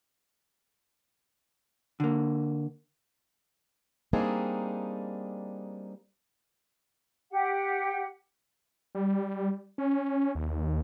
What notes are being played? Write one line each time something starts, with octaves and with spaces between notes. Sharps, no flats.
D3 A#3
G3 A#3 C4 D4 D#4 G#4
G4 F#5
G3
C#4
D#2